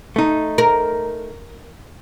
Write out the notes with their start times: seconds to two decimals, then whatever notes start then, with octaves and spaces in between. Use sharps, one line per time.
0.16 A3 D#4
0.58 A#4